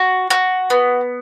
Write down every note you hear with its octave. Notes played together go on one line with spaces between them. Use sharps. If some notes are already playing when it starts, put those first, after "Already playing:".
Already playing: F#4
F#4
B3